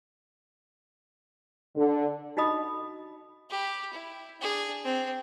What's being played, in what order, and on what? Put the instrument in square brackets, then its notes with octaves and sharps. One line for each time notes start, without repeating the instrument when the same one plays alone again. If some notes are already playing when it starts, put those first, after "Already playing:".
[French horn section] D3
[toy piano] D#4 F#4 D#5 B5 D#6
[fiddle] G4 B5
E4
D4 G#4
C4